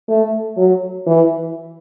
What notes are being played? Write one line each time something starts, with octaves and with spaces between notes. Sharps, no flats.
A3
F#3
E3